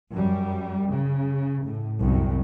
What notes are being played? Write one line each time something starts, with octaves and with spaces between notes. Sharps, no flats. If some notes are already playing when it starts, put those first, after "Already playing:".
F#2 G3
C#3
A2
C2 F#2 A2